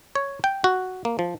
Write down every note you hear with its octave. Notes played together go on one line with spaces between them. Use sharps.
C#5
G5
F#4
A#3
F3